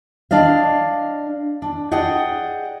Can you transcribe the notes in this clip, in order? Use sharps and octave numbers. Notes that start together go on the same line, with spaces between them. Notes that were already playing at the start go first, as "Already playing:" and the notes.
D4 D5 D#5 F5
D4
G#4 D5 D#5 F#5 G5